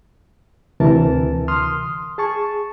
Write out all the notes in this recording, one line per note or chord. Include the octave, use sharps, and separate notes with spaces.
D2 C3 E3 A#4 A5
C6 D#6 F6
G#4 A5 C#6